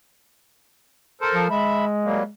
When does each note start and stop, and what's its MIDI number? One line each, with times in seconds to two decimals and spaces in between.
1.21 1.48 69
1.21 1.48 70
1.21 1.48 72
1.34 1.46 53
1.50 2.30 56
1.50 1.85 76
1.50 1.85 83
2.04 2.23 54
2.04 2.23 55
2.04 2.23 58